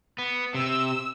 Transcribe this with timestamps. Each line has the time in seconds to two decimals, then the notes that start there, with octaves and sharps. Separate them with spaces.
0.19 B3
0.54 C3 E6